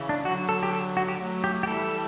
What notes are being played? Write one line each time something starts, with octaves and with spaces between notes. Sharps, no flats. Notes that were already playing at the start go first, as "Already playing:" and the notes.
Already playing: C#3 E3
D4
D3 F#3 F#4
A4
G4
A4
F#4
G4
F#3 A3
G4
G4
E3 G3 A4